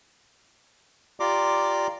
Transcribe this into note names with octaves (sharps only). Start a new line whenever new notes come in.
F4 G4 D5 A#5 C6 D6